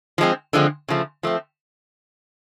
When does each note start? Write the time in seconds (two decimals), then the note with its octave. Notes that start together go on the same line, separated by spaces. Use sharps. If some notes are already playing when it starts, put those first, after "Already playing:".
0.18 F3 G#3 C4
0.53 D3 F3 G#3 C4
0.88 C#3 F3 A3
1.23 F3 A3 C4